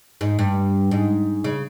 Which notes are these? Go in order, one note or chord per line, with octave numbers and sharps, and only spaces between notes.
G#2
G2
G#2
C#3